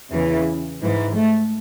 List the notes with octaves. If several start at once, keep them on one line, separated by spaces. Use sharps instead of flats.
E2 C#3 E3
G#2 E3
A3